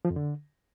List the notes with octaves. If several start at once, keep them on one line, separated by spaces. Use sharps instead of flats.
F3
F2
D3